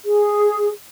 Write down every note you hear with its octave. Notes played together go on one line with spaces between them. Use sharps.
G#4